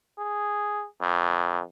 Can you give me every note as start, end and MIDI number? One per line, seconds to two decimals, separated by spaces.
0.18 0.85 68
1.01 1.61 41